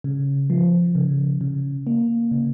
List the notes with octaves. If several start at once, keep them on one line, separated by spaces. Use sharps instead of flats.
C#3
F3
C#3
C#3
A#3
C#3